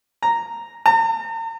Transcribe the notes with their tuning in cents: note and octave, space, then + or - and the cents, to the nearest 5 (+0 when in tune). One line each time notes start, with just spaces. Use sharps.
A#5 -5
A#5 -45